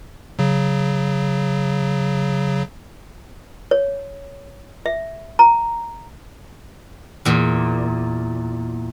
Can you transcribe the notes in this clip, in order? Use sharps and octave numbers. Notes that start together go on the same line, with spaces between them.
C#3 F#3
C#5
E5
A#5
E2 A#2